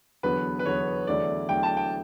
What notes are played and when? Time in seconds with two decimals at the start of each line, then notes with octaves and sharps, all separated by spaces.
0.23 E2 D3 F#3 B3 B4
0.59 B4
0.66 E2 D3 F#3 B3 C#5
1.07 E2 D3 F#3 A3 E4 D5
1.49 E2 D3 F#3 A3 E4 G5
1.63 A5
1.77 G5